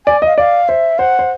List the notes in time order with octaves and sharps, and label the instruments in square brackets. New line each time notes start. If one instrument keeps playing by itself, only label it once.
[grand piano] D5 [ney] G#5
[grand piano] D#5 [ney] F5
[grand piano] D5 [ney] F5
[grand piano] C5 [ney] E5
[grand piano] C5 [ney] F#5
[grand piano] C5